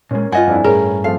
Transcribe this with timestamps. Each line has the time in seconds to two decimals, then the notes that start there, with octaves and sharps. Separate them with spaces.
0.11 A#2 G#3 C#4 A#4
0.32 G2 F4 D#5 F#5 G#5
0.47 F2 D4 E4
0.64 A2 C#4 G#4 A#4
1.04 F3 A3 C4 F5